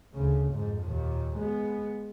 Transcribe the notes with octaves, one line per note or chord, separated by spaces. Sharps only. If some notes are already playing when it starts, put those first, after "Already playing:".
D2 C#3
F2 G#2
D#2 A#2
G#3 B3